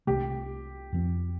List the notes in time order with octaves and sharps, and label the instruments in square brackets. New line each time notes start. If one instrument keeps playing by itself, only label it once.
[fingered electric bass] C2 C3 A3 [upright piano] G4
[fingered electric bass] F2 F3 C4